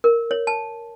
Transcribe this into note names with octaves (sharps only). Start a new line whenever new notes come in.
A#4
C#5
A5